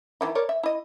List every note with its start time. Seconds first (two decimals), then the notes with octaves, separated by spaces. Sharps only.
0.21 D#3 E3 E4
0.35 A#4 C#5 D5
0.49 E5
0.63 E4 D#5